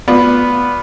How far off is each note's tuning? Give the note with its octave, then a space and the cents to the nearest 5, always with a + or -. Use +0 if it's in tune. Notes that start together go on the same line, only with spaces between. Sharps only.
B3 +0 F4 +10 D5 +0